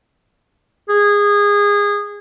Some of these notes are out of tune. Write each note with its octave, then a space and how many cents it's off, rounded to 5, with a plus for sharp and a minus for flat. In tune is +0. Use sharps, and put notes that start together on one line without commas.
G#4 -20